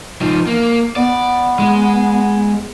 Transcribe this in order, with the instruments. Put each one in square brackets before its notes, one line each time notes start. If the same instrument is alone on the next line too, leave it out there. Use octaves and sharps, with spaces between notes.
[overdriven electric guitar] F3 D#4
A#3
[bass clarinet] B3 [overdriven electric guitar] D5
[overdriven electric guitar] G#3